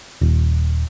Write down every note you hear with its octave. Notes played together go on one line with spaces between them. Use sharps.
D#1